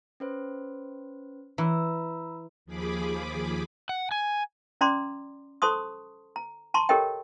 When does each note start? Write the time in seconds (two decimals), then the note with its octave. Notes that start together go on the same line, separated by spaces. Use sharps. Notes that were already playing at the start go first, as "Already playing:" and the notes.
0.20 C#4 B4 C5
1.58 E3 A#5 B5 E6
2.66 D#2 F3 G#4 B5 D6
3.89 F#5
4.11 G#5
4.81 C#4 D5 A#5 C6 D6
5.62 A4 C5 A5 C6 C#6 D#6
6.36 A#5
6.74 A5 A#5 C6 C#6
6.89 G4 A4 A#4 C#5 D#5 G5